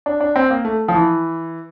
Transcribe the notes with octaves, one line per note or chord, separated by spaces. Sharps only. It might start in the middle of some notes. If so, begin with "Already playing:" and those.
D4
D4
C4
A#3
A3
F3
E3